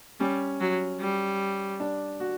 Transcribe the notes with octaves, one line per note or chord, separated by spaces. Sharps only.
G3 C#4
F#3
G3
D4
F#4